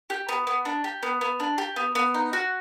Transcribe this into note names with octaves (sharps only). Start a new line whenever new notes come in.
G4
B3
B3
D4
G4
B3
B3
D4
G4
B3
B3
D#4
F#4